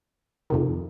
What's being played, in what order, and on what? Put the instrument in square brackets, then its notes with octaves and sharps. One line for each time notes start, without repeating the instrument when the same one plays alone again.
[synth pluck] F2 C3 D#3